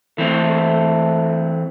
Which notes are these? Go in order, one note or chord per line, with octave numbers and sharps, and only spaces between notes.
E3 A3 C4